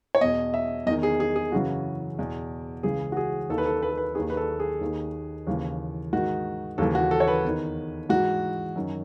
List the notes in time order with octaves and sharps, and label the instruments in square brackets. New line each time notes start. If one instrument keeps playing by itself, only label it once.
[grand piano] C#5
E2 B2 D#5
E5
E2 D#5
D#3
G#4
G#4
G#4
F#2 C#3 E3 F#4
E2 B2
C#2 C#3 E3 G#4
F#4
G#4
D#2 D#3 A4
B4
A4
B4
A4
B4
D#2 D#3 G#4
B4
A4
G#4
D#2 D#3
D#2 C#3 E3
G#2 D#3 F#4
D#2 C#3 E3 A4
F#4
A4
C#5
B4
E2 D#3
G#2 E3 F#4
F#2 D#3